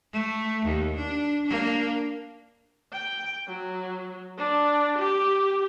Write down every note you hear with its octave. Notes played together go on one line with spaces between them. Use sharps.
A3
D#2
D4
A#3 D4
G5
F#3
D4
G4